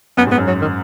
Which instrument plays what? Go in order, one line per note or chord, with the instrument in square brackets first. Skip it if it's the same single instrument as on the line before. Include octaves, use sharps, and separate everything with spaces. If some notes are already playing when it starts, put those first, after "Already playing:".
[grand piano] F#2 [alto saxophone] B3
[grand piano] G#2
[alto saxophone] B3
[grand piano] F#2
[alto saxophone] F#3
D#3